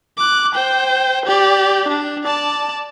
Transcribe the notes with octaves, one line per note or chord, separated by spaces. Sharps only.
D6 F#6
C5 G5
G4 D5
D4
D5 A5